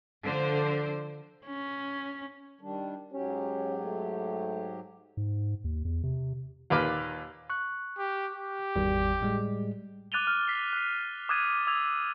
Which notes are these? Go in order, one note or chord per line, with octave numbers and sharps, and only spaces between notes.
D3 F3 C5
C#4
D#3 G3 D4
G#2 F#3 C#4 G4
A3
G#2
D#2
E2
C3
D#2 A#2 B4 D6 F6
C#6 F#6
G4
G4
G#1 E2 G3
A2 G3 G#3
D6 F#6 A6 D#7 F7 G7
F6
B6 C7
F#6 B6
D6 D#6 F#6 G#6 A6 D#7
D6 E6 G#6 F7